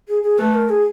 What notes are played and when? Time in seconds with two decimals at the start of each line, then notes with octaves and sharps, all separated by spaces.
0.08 G#4
0.23 G#4
0.38 A3 B4
0.54 A#4
0.69 G#4